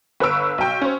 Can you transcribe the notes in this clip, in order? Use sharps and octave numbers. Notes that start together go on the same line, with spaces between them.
G1 B4 C#6 E6 D7
B1 G5
C#4 C5